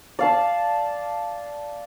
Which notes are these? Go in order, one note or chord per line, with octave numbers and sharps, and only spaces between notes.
D5 F5 A5